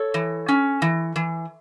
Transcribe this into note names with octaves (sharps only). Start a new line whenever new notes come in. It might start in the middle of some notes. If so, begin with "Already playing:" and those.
Already playing: A4 C#5
E3
C#4
E3
E3